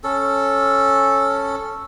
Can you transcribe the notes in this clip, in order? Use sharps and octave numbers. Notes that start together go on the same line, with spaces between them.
C#4 A4